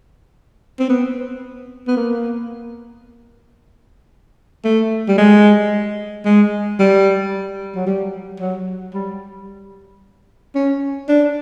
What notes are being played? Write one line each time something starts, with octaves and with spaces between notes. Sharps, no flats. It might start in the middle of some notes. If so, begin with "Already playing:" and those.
C4
B3
B3
A#3
A3
G3
G#3
G#3
G3
F#3
G3
F#3
G3
C#4
D4